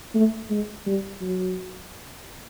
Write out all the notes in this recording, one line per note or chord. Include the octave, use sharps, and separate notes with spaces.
A3
G#3
G3
F#3